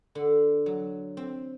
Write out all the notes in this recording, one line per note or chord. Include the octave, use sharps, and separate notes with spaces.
D3
F#3
C4